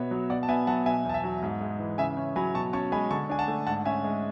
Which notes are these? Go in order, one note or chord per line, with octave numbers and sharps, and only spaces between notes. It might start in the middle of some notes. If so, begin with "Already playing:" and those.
Already playing: B2 B3 C#5 E5
F#3
B2 D5 F#5
A5
B3 E5 G#5
F#3 F#5 A5
B2 E5 G#5
E2 A5
E5 G#5
F#3
G#2
G#3
E3
C#3 E5 G#5
C#4
F#3 G#5 B5
B2 A5 C#6
C#4 A5 C#6
G#3 G#5 B5
D3 A5 C#6
D4 G#5
F#5 A5
A3
G#2 F#5 A5
C#4 E5 G#5
G#3